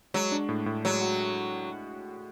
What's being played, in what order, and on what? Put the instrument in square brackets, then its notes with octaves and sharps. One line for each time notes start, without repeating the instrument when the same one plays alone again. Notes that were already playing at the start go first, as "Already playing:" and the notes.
[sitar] F#3 [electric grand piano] G#3
[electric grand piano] D4
A2
A2
[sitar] F#3 [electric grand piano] G#3
[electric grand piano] F#4